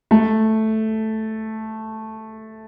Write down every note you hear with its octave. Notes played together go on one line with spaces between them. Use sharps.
A3